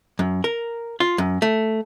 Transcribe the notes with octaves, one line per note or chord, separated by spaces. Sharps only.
F#2
A#4
F4
F#2
A3